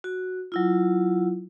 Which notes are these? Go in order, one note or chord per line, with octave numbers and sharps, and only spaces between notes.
F#4
F#3 E4 F4